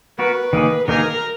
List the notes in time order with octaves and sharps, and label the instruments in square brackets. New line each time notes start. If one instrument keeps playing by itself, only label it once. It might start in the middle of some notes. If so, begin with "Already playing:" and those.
[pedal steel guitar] B3 F#4 A#4 [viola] B4
[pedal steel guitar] D#3 A#3 D#4 G#4
[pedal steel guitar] D#3 A#3 D#4 G#4 [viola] A#4